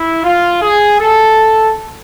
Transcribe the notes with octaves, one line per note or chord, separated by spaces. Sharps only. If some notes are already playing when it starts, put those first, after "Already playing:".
Already playing: E4
F4
G#4
A4